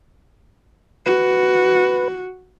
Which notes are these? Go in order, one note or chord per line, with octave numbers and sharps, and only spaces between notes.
F#4 B4